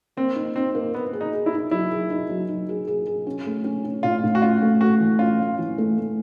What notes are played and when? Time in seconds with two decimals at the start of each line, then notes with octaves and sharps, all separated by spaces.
0.17 A#3 C4
0.36 D#4
0.56 C4 D#4
0.75 A#3
0.94 A#3 B3
1.13 G#4
1.21 D#4
1.33 G#4
1.46 E4
1.53 D#4
1.71 F#3 E4
1.91 G#4
2.10 D#4
2.29 F#3
2.48 D#4
2.69 G#4
2.87 G#4
3.06 G#4
3.27 C#4
3.46 A3
3.64 C#4
3.84 C#4
4.03 A2 F4
4.24 A2
4.35 F#4
4.42 C#4 F4
4.62 A3
4.81 A3 F#4
5.00 E3
5.19 C#4 F4
5.39 A3
5.58 E3
5.78 A3
5.97 A3